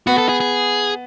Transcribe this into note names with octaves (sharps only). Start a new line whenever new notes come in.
B3 F#4
A4
G#4
G#4